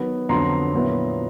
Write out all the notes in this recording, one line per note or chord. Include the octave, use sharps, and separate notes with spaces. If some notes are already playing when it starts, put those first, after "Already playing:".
Already playing: D#3 F#3 B3
F2 D3 F#3 B3 A#5 C6
A#2 F#3 B3 E4